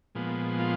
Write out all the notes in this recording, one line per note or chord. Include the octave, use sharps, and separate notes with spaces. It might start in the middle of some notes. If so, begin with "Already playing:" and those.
A#2 F3 G#3 B3
F4